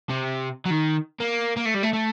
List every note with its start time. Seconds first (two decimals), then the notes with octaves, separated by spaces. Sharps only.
0.10 C3
0.66 F#3
0.70 D#3
1.20 A#3
1.57 A#3
1.65 A3
1.74 G3
1.83 A3
1.93 A3